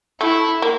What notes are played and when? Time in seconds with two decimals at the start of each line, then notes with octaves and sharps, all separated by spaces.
0.21 A3 E4
0.62 A#3